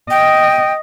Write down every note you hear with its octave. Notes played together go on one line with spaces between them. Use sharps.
D#5 G5